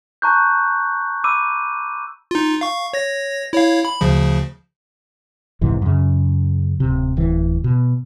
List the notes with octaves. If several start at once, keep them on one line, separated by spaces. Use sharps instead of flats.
A5 A#5 C#6 F#6 G6
B5 D6 E6 D#7
D#4 F4
F5 C#6
C#5 A#6
E4 C#5 F5
B5
D2 C#3 F3
A#1 G#2 C3 E3
F#2 C#3
D1 C3
D1 E3
B2